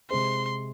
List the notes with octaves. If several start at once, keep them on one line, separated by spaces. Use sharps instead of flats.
C3 G#3 C4 G#4 C5 C6